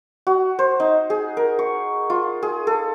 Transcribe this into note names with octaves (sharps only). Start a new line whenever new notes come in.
F#4
C5
D#4
G#4
A#4
C#6
F4
G#4
A4